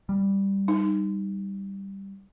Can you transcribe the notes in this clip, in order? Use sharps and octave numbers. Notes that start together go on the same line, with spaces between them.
G3
D#4